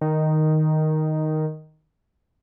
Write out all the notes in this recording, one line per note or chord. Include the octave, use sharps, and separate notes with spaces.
D#3